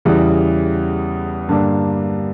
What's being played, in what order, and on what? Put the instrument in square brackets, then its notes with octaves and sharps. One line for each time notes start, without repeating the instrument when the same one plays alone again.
[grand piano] E2 C#3 E3 G3
G2 D3 G3 A#3 D4